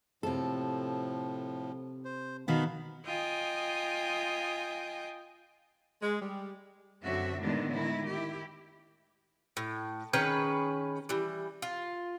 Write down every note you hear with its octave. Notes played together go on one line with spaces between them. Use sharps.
A2 C3 F3 A4
C5
B2 D#3 B3 F5 B5
F4 D#5 G5 G#5 D#6
G#3
G3
F#2 D3 C4 F#4 E5
A2 D3 D#3 G#3 B3 D4
D#3 E4
E4 G4
A2
D#3 C#4 G#4 B4
E3 G3
F4